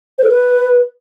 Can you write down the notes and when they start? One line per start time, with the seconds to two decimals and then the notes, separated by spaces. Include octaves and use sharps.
0.19 C5
0.24 A4
0.29 B4